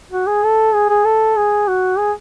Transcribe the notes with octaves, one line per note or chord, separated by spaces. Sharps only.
F#4
G#4
A4
G#4
G#4
A4
G#4
F#4
G#4